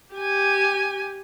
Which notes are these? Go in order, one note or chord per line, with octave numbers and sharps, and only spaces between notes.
G4 G#5